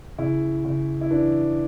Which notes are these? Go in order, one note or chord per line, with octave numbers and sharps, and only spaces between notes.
C#3 E4
C#3
E4
E3 D4